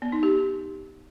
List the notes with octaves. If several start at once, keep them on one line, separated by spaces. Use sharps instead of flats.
B3
D#4
G4